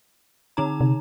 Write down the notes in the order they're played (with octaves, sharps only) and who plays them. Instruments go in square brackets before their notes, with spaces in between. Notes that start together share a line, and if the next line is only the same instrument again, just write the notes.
[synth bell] D3 D#4 A#5
[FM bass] C3